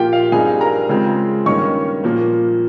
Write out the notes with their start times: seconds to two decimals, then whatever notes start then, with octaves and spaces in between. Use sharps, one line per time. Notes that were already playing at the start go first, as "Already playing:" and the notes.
Already playing: A#2 F3 A#3 F4 G4 G5
0.13 F5
0.32 G2 G3 C4 D#4 G#4 G#5
0.61 A#4 A#5
0.89 C#3 G#3 C4 F4
1.46 G2 D#3 A#3 C#4 C#5 C#6
2.04 A#2 F3 A#3